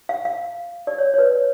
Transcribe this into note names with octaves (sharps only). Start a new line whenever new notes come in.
F5
F5
D5
C#5
C#5
B4